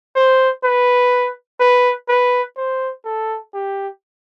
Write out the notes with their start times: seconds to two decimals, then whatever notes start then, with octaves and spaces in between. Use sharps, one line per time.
0.16 C5
0.64 B4
1.60 B4
2.08 B4
2.57 C5
3.05 A4
3.54 G4